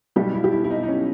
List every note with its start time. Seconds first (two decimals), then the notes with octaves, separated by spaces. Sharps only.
0.16 B1 B2 G3 G4
0.34 E4
0.44 G4
0.52 E4
0.64 E4
0.70 D#4
0.83 D#4
0.88 C#4